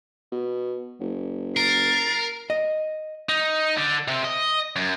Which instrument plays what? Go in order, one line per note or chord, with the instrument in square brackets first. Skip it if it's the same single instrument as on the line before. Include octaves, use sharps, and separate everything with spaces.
[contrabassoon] B2
F#1
[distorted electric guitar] A#4 [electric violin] A6 C7
[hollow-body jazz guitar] D#5
[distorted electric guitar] D#4
D3
C3 C4
D#5
F#2